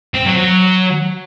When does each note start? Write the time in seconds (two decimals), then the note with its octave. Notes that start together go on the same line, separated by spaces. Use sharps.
0.14 C4
0.26 F#3
0.37 F#3